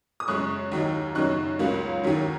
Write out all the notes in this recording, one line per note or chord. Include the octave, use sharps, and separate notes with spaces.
D#6
F#2 C#3 G#3 C#4 C#6 F#6
D#2 D#3 F#3 D#4
F#2 C#3 F#3 D#4 C#6 F#6
C#2 C#3 F#3 A#3 C#4
D#2 D#3 F#3 C#4